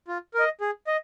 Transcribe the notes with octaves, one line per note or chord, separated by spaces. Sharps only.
F4
A#4 D#5
G#4
D#5